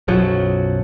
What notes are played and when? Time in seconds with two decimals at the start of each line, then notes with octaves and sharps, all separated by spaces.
0.08 B1 F#2 F3 F#3